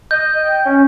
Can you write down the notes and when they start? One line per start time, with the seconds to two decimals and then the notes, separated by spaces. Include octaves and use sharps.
0.11 D#5 G6
0.43 G5
0.65 C#4